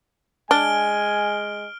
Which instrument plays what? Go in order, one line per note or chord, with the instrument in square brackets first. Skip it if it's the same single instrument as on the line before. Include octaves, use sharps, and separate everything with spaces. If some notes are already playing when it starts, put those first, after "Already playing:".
[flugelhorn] G#3 [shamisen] D4 [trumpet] G#5 [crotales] F6 D7 G7